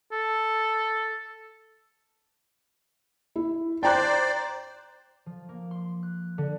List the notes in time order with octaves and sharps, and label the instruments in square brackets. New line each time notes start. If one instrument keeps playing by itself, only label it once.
[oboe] A4
[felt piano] E4
[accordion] C5 D5 [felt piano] G5 A#5 F#6
[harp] F3
A#3
C6
F#6
D3